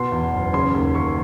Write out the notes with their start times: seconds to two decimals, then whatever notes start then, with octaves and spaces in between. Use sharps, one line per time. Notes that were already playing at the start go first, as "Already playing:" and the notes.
Already playing: B2 C6
0.12 E2
0.33 F#1
0.53 C#3 C6
0.74 D#2
0.95 D#2 C#6